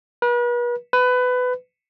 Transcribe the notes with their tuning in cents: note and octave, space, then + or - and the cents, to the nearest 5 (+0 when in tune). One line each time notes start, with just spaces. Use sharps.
B4 -40
B4 +20